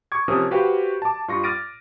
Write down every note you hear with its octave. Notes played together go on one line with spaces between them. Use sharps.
C#6 D6 G#6
C3 F3 C#4 A#4 D#6
F#4 G4 B4 C5 F5 G5
A5 D6
G2 F4 C#6 A#6
D6 F6 A6 A#6 D7 D#7